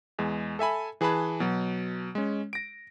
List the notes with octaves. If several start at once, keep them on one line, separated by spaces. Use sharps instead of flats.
E2 G#3
A4 E5 G#5 B5
E3 G#4 B4 A5 B5
B2 F#3
G#3 C#4
A#6 D7